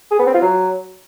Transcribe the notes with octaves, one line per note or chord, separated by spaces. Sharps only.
G#4
B3
C4
F4
F#3